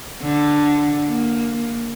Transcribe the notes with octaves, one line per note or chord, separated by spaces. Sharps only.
D3
A#3